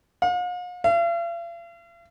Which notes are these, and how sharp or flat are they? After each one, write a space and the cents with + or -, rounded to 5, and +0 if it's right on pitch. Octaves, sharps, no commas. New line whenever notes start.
F5 +45
F5 -45